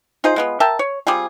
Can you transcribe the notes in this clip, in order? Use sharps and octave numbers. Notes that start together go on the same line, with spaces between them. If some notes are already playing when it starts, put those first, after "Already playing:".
D#4 F4 G#4 C5
G#3 B3 F4
A#4 E5 G5 A5
C#5
G3 C4 F4 G#4